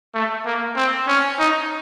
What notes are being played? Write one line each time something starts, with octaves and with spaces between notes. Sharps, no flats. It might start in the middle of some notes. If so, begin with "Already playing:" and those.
A3
A#3
C4
C#4
D#4